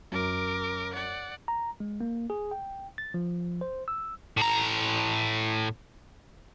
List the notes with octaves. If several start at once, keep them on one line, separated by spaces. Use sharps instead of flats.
F#2 A#4 D6
D5 F#5
A#5
G#3
A#3
G#4
G5
A6
F3
C5
E6
A2 A#5